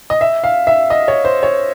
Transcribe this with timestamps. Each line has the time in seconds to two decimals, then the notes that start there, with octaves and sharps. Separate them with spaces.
0.10 D#5
0.21 E5
0.44 F5
0.67 E5
0.90 D#5
1.08 C#5
1.25 C5
1.43 C#5